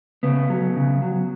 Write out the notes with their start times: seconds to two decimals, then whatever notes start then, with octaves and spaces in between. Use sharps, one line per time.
0.23 C#3 B3
0.50 F#3
0.76 C#3
1.02 F#3